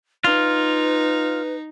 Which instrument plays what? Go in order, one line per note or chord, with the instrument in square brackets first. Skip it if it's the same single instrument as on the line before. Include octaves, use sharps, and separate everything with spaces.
[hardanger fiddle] D#4 [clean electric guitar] F4 [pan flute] B4